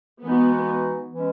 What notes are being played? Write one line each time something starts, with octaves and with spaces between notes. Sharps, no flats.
E3 G#3 B3 D#4 F#4
E3 G#3 C#4